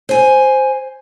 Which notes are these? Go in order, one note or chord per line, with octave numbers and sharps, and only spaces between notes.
C5 G#5